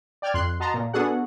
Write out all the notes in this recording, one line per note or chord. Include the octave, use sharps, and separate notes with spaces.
D5 G5 F6 G#6
F2 C6 F#6
F#4 D#5 A5 A#5 C6
A#2
B3 D4 F#4 G#4 A4 F#5